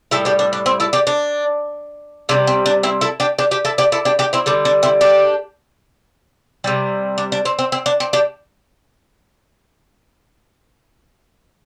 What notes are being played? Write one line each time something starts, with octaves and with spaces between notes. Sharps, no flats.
A2 G3 E4 A4
D4 G4
D4
D4
C4 E4
E4 A4
D4 G4
D4
C3 G3 D4
C4
D4
C4 E4
E4 A4
D4 G4
D4 G4
D4 G4
E4 A4
D4 G4
E4 A4
D4 G4
D4 G4
C4 E4
D3 G3 D4
D4
C4 E4
D4 G4
C3 G3
D4
D4
C4
C4
C4
D4
C4
D4 G4